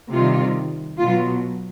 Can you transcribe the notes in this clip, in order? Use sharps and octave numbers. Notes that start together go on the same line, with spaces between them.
C3 D#3 G3 F4
B2 F#3 F4